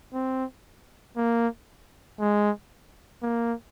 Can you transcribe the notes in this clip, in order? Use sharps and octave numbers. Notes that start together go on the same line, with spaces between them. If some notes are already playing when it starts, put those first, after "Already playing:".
C4
A#3
G#3
A#3